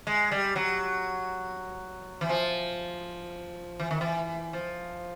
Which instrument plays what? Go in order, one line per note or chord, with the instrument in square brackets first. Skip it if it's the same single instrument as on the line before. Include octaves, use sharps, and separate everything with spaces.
[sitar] G#3
G3
F#3
E3
F3
E3
D#3
E3
F3